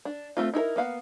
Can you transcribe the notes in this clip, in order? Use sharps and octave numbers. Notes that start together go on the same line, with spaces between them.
D4
A3 C4 F4
D#4 E4 A4 A#4
A#3 B3 F5 F#5